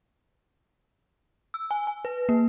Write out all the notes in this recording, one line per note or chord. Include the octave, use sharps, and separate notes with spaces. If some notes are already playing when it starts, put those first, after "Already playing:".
E6
G#5
G#5
B4
A#3